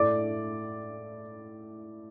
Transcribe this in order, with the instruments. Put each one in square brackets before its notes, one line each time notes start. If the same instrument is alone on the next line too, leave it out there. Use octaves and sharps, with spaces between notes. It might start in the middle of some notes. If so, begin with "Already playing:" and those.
Already playing: [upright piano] A2 A3 D5 D6